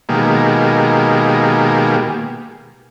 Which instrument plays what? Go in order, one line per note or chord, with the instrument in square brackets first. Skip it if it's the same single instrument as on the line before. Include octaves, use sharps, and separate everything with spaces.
[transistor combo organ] B2 D#3 G#3 A#3 G4